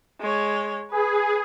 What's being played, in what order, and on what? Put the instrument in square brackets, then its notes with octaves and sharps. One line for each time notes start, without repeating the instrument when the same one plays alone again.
[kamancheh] G#3 C#5
[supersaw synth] G#4 [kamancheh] B4